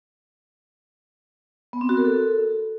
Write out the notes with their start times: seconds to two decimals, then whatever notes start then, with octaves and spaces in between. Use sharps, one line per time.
1.73 B3
1.81 C4
1.89 F#4
1.97 A#4
2.05 A4